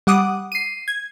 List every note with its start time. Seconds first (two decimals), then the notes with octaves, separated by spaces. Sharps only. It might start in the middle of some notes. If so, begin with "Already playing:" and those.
0.07 G3 F#5 D6 D#6
0.52 C7 D#7
0.88 G#6